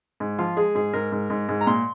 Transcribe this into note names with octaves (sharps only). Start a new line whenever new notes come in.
G#2
F3 F4
G#3 G#4
G#2 G#4
G#2 A#4
G#2
G#2
G#2
A#5
A#2 C6